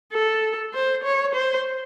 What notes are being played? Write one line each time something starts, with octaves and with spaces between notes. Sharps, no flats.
A4
C5
C#5
C5